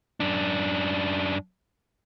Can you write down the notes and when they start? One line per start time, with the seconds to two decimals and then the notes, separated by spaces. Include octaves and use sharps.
0.20 F#2 D4